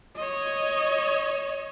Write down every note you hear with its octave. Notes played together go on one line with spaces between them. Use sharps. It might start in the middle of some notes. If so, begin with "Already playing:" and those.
C#5 D#5